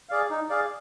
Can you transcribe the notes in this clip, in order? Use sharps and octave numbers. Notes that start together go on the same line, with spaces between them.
G#4 D5 F5
D#4
G#4 D5 F5